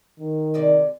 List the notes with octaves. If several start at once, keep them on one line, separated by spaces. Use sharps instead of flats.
D#3
C3 G#3 D5